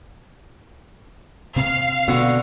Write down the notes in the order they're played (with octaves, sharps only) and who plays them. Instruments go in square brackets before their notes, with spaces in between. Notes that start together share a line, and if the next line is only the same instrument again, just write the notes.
[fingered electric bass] C3 C4 [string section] F5
[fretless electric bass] B2 [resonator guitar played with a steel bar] D3 F#4